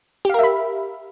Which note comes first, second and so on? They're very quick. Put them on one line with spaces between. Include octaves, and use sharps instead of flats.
G4 F5 A#4 E5 B5